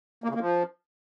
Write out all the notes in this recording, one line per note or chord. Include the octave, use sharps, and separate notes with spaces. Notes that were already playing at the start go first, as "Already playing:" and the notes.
A#3
C#3
A#3
F3